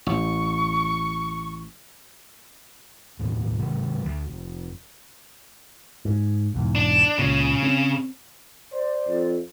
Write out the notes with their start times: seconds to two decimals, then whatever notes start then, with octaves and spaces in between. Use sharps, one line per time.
0.07 A1 C#6
3.19 A#1 D#2 A2
3.59 C3 D#3 F#3
4.04 D2
4.27 F1
6.05 G#2
6.54 B1 E2 G#2
6.75 D4
7.19 C#2 A#2 C#3
7.63 C4
8.72 C5 D5
9.07 F2